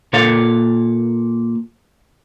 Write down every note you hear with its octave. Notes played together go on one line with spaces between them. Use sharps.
A#2 A#3 A4 C#5 F5